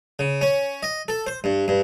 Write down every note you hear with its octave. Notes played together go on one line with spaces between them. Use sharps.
C#3
C#4
D#5
A4
C5
G2
G2